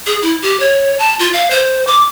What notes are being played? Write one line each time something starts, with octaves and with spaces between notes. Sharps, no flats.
G#4
E4
G4
C#5
A5
F4
F5
C5
D6